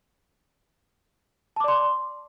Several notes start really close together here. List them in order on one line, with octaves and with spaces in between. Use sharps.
A5 D6 D5 C6